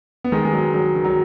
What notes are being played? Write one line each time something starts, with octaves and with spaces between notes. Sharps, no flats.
B3
D#3 G#3
G#3
F#3
F#3
D#3
F#3